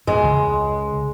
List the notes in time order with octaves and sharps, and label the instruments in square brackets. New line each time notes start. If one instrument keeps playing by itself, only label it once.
[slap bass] E2 [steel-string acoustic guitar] G#3
[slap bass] C#2